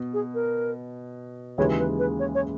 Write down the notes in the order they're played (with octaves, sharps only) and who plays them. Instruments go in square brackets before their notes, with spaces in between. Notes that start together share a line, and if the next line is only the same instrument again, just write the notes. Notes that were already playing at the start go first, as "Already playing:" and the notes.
Already playing: [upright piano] B2
[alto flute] G#4
A#4
[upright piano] D#2 C#3 E3 G#3 [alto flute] C#5
[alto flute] B4
B4
C#5
C#5